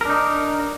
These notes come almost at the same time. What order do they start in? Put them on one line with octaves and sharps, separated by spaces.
A#4 D4 D#4